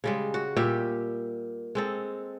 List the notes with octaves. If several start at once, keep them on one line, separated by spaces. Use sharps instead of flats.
C#3 G3 G#3
F#4
A#2 G3 G4 E5
G#3 C4 A4